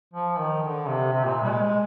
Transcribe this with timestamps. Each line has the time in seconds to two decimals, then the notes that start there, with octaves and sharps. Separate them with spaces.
0.13 F3
0.38 D#3
0.63 D3
0.88 C3
1.12 C3
1.25 A#2
1.43 G3
1.50 G#3
1.62 G#3